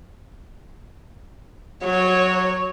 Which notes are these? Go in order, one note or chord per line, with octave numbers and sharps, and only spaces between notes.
F#3 C#5